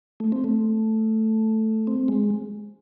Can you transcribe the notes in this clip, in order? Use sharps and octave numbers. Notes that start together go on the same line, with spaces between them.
A3
C4
A3
C4
G#3